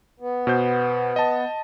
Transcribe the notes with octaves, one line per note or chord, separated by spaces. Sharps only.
B3
B2 C5 G6
D#5 A5